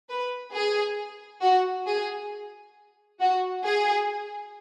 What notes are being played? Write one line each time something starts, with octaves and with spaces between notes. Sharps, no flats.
B4
G#4
F#4
G#4
F#4
G#4